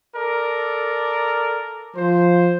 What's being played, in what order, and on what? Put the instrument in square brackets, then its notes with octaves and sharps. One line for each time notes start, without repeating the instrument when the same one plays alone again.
[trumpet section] A4 A#4 D5
[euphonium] F3 [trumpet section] C5